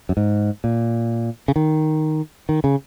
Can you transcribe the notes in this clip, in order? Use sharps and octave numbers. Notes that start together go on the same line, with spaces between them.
F#2
G#2
A#2
C#3
D#3
D#3
C#3